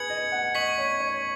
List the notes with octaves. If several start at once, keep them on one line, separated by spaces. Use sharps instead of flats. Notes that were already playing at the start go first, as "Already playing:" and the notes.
Already playing: G#4 B4 G#6 C#7 F#7
D#5
F#5
D#5 C#6 B6 F#7
C#5
C#5